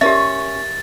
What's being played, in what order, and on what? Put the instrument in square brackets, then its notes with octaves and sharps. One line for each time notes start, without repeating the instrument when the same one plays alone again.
[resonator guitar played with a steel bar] C#4 [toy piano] G4 A#4 E5 [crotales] A6